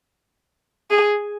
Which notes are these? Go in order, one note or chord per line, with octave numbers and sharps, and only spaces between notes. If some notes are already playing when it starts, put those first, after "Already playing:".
G#4